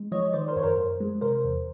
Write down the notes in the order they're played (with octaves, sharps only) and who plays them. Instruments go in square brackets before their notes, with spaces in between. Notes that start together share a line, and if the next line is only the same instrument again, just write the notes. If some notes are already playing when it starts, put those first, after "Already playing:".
Already playing: [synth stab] G#3
F3 C#5 D#5
D#3 C5 D5
A#4 C5
F#2 C#5
A#4 C5
F#2
G#3
C3 A#4 C5
E2